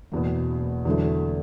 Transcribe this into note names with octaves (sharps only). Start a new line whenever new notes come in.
F#1 E2 B2
E2 D3 F#3 A3